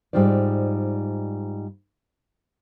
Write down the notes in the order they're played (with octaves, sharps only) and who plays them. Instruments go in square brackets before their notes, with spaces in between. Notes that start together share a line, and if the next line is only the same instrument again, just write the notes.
[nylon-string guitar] G#2 G3 D#4 F4 C5 D5